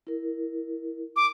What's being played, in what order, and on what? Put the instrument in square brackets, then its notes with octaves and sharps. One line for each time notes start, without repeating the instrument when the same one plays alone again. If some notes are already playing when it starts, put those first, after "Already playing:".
[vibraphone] E4 A#4
[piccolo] D6